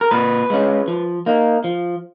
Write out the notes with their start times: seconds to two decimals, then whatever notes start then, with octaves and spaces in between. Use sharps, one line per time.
0.01 A#4
0.11 A#2 B4
0.50 G#3 C#4
0.88 F3
1.26 A#3 D#4
1.64 F3